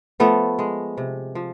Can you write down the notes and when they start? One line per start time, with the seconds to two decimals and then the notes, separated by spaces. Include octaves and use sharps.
0.20 F3 A3 B3
0.59 G#3
0.98 C3
1.35 F3